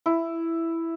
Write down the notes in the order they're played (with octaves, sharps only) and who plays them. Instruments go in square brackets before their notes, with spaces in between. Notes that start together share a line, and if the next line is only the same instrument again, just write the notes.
[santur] E4